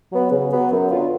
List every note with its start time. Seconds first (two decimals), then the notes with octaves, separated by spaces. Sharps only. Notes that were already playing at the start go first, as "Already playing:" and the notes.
0.12 F#3 B3
0.31 C#3
0.51 F#3 B3
0.71 F#2
0.91 D3 F#3 B3 F4